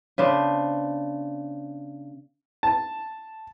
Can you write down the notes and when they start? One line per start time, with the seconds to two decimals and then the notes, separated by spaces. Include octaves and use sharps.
0.18 C#3 B3 D4 C5
2.63 A5